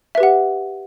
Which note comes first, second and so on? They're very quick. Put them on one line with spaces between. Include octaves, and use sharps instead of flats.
E5 B4 G4 F#5